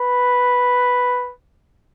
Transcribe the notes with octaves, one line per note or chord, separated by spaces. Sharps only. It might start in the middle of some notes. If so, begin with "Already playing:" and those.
Already playing: B4